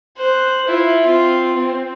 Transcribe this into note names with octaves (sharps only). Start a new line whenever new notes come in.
C5 F#6
E4 F4
C4 F4
C4